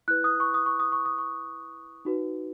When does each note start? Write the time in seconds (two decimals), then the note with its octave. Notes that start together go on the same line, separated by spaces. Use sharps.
0.08 E4 B4 F#6
0.24 D#6
0.40 C#6
0.54 D#6
0.66 C#6
0.80 D#6
0.92 C#6
1.06 D#6
1.18 C#6
2.05 D#4 F#4 B4